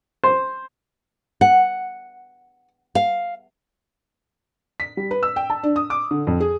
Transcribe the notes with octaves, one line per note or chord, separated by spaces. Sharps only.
C5
F#5
F5
B6
G3
B4
E6
G5
A5
D4
D#6
D6
D3
F2
G#4